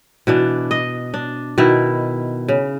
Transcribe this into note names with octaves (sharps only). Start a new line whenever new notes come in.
B2 E3 D4
D#5
D4
B2 D#3 E4
C#3